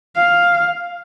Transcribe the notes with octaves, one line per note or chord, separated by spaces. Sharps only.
F5